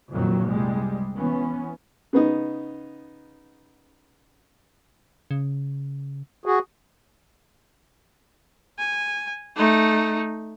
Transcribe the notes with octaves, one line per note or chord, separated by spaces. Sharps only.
F#1 F2 A#2 D#3 F#3
C2 G3 G#3
E3 B3 C#4
C#3 B3 D#4
C#3
F#4 G#4
G#5
A3 D#4